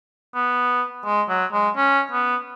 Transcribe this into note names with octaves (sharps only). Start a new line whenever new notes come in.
B3
G#3
F#3
G#3
C#4
B3